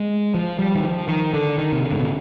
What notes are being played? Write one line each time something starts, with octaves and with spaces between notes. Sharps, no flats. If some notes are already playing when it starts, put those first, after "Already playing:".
Already playing: G#3
F3
G3
D#3
F3
D#3
D3
D#3
C3
D3
G#2
B2